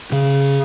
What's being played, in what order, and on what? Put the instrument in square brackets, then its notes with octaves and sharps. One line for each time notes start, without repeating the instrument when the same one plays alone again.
[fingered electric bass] C#3